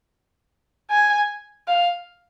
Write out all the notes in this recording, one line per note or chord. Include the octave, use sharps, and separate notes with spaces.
G#5
F5